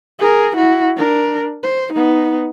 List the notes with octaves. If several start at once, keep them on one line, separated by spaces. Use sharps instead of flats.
G#4 A#4
E4 F#4
D4 A#4
C5
B3 D#4